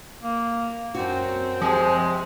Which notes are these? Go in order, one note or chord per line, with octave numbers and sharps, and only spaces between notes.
A#3
F#2 C4 F#4
C3 F3 G3 G#3